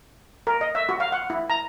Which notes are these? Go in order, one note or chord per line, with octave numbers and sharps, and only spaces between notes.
A#4
D#5
E5
F#4
F5
F#5
E4
A#5